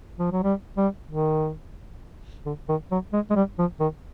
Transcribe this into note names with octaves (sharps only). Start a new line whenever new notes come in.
F3
F#3
G3
G3
D#3
D3
D#3
F#3
G#3
G#3
G3
F3
D#3